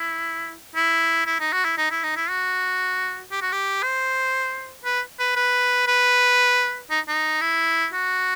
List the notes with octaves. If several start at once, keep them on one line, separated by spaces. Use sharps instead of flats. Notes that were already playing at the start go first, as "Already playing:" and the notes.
Already playing: E4
E4
E4
D#4
F#4
E4
D#4
E4
D#4
E4
F#4
G4
F#4
G4
C5
B4
B4
B4
B4
D#4
D#4
E4
F#4